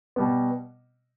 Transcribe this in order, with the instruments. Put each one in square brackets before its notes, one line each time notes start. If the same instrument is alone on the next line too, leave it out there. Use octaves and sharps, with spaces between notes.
[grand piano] B2 G3 B3